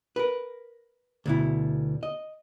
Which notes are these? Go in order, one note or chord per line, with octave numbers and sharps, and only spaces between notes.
A#4 B4
D2 B2 E4
D#5